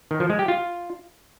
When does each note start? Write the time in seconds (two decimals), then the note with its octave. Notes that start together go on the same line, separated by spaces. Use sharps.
0.11 D#3
0.20 F3
0.30 G#3
0.39 G4
0.48 F4